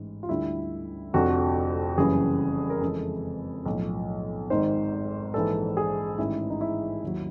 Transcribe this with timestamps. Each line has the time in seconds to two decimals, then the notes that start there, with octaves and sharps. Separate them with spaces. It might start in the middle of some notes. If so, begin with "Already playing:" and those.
Already playing: A1 G#2 E3 G#3
0.23 F4
0.29 D2 D3 G3 E4
1.13 F1 F2 D3 F3 F#4
1.97 F#1 F#2 C#3 E3 G3 G#4
2.70 A#4
2.81 F2 C#3 E3 G#3 A4
3.66 B1 A2 F3
4.50 G#1 G#2 D#3 C5
5.34 A#1 G#2 E3 A4
5.77 G#4
6.18 A1 G#2 D#3 E4
6.50 D#4
6.61 E4
7.03 D#2 D#3 F#3